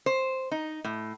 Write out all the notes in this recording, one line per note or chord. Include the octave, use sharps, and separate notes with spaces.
C5
D#4
A2